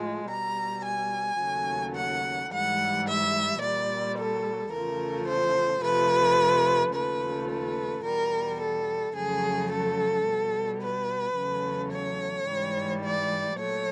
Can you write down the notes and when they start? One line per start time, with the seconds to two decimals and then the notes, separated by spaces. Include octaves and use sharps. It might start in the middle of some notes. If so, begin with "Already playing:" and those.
Already playing: A2 F3 G#3
0.29 B2 G3 A#5
0.84 G#5
1.40 D#2 C#3 F#3 A3
1.95 F#5
2.50 G#2 E3 G3 F#5
3.06 E5
3.61 A#2 G3 D5
4.17 A4
4.72 E2 C#3 F3 A3 A#4
5.27 C5
5.82 F2 C3 F3 A3 B4
6.93 D#2 C#3 F3 A3 B4
7.49 B4
8.04 E2 B2 G3 A#4
8.60 A4
9.15 F2 C#3 F#3 A3 G#4
9.70 A4
10.26 B2 G3
10.81 B4
11.36 E2 C#3 F#3 A3
11.91 C#5
12.47 G#2 E3 G3
13.03 D5
13.58 A#2 F#3 A3 C#5